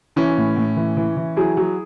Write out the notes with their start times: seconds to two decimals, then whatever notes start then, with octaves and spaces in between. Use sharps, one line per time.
0.16 E3 C#4 E4
0.37 A2
0.57 A2
0.77 E3
0.97 E3
1.17 E3
1.37 F#3 E4 G#4
1.57 F#3